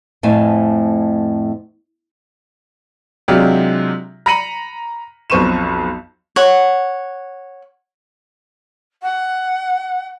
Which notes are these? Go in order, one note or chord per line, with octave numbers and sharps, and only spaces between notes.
F2 A2 A3 C5 F5 G#5
C3 F#3 G#3 D4 F4 G4
A#5 B5 A#6 C#7 D#7 F#7
B1 F2 C5 C#6 D#7 E7
C#5 F#5
F#5